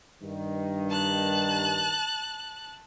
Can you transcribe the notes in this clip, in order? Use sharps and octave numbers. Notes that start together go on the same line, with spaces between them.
G2 D#3
A5 F#6